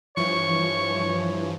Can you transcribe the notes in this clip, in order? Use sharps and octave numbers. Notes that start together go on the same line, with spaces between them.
G2 E3 F3 C#5 C#6